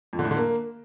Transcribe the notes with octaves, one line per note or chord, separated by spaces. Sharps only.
F2
D3
A2
D3
A#3